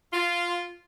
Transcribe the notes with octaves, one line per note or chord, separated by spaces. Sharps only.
F4